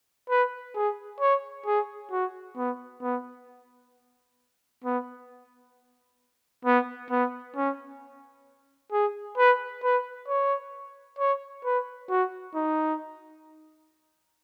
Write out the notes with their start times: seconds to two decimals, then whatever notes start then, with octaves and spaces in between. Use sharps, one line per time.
0.30 B4
0.75 G#4
1.21 C#5
1.66 G#4
2.12 F#4
2.57 B3
3.02 B3
4.84 B3
6.65 B3
7.11 B3
7.56 C#4
8.92 G#4
9.38 B4
9.83 B4
10.28 C#5
11.19 C#5
11.65 B4
12.10 F#4
12.55 D#4